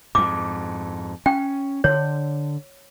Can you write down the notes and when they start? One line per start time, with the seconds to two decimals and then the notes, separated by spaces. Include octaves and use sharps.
0.15 F2 G#2 D6
1.26 C#4 G5
1.84 D3 C#5